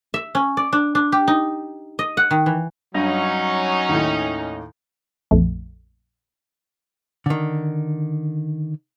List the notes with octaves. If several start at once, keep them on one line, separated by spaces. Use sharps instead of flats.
E5
C#4
D5
D4
D4
G4
D#4
D#5
F#5
D#3
E3
G2 F#3 C#4 D#4 A#6
D#2 A2
A#1 F2 A3
D3 D#3